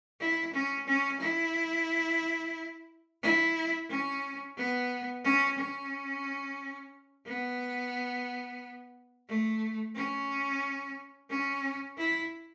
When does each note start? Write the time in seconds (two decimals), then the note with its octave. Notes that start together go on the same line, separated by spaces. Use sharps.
0.20 E4
0.54 C#4
0.87 C#4
1.21 E4
3.23 E4
3.89 C#4
4.57 B3
5.24 C#4
5.58 C#4
7.26 B3
9.29 A3
9.95 C#4
11.29 C#4
11.98 E4